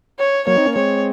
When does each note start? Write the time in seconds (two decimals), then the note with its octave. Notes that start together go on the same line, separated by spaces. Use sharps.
0.19 C#5
0.47 F#3 A#3 C#5
0.56 C4 D#4
0.66 A#3 C#4
0.75 G#3 C4 C#5